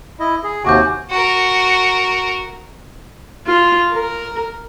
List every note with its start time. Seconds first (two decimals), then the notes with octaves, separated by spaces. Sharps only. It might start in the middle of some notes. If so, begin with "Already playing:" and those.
0.20 E4 D#5
0.43 G#4
0.65 D#2 C3 F#4 G#5 D6 G6
1.11 F#4 A#4
3.47 F4
3.93 A#4